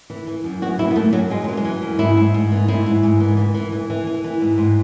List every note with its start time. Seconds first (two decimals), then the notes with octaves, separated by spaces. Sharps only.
0.10 E3
0.27 E3
0.44 F#2
0.62 E3 F#4
0.78 E3 E4
0.91 B3
0.95 F#2 A3
1.13 F#2 F#3
1.30 F#2 G#3
1.44 F#3
1.48 E3
1.57 G#3
1.64 E3
1.82 F#2
1.99 G#2 E4
2.17 G#2
2.34 G#2
2.52 E3
2.68 G#2 E4
2.86 G#2
3.03 G#2
3.20 E3
3.37 E3
3.54 E3
3.72 E3
3.90 E3
4.07 E3
4.24 E3
4.41 G#2
4.58 G#2